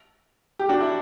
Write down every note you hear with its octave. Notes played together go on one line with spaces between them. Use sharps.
G4
D4 F#4
E4